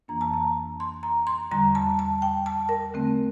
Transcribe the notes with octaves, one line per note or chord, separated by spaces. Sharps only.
F2 E3 A#3 D4 A#5
A5
A#5
C6
A#5
C6
E2 D3 G3 A#5
A5
A5
G5
A5
A#4
D3 A3 C4